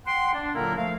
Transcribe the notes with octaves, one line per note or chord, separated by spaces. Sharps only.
F#5 G5 C6
D4
A#2 D3 F#3 A#3 E4 A#4
F3 A3 F5